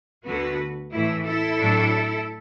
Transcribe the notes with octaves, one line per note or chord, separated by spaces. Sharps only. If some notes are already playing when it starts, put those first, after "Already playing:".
D2 D3 B3 F#4 B4
A2 E3 A3 E4
E4 A4
A2 F#3 D4